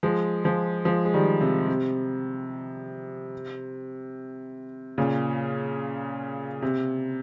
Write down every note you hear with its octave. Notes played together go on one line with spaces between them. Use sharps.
F3 G#3
F3 G#3
F3 G#3
G#3
D#3 G3
C3
C3
A#2 C#3
C3